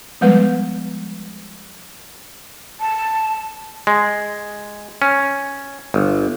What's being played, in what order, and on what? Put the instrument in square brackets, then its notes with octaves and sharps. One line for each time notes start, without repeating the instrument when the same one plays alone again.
[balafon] F3 G3 G#3 B3 B4
[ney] A5
[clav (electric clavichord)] G#3
C#4
G1